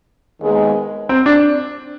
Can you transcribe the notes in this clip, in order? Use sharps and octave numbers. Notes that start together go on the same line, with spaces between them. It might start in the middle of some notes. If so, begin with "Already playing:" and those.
D#2 D#3 G#3 B3
C4
D4